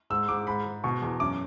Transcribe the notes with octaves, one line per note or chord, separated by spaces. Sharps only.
G#2 E6
G#2 D6
G#2 B5
G#2
B2 C#6
E2
F#2 D6